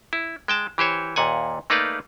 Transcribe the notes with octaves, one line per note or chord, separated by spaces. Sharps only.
E4
G#3 G5 A5
E3 G4 C5 C#5
D#2 A#2 F#5 G#5
A3 A#3 D#4 B4 D5 F5